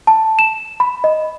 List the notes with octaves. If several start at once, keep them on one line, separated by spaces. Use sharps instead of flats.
A5
E7
B5
D#5